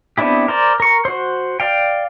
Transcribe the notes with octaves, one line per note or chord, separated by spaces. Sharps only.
B3 C4 D4 E4 G4
A#4 C5 D5
A#4 C#6
F#4 C5
D5 F5 G5